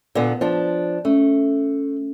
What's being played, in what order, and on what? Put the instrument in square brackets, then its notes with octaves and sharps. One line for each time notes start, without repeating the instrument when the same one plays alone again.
[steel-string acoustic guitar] A#2 D3 B3
F3 D4
[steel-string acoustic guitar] A3 [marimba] C#4